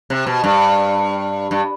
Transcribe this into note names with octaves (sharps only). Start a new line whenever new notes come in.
C3
B2
G2
G2